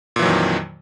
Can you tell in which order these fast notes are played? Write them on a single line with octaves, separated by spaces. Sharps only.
A#2 E3 F#3 D#3 F2